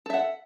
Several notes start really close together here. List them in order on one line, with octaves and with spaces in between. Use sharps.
A4 E5 F#5